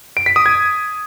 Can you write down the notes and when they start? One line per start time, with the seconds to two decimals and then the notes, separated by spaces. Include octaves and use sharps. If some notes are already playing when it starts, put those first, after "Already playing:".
0.17 D7
0.26 B6
0.36 D#6
0.46 G#6